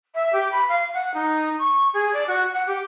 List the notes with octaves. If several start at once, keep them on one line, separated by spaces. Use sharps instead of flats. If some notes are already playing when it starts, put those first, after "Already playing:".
E5
G4
B5
F5
F#5
D#4
C#6
G#4
D5
F#4
F#5
G4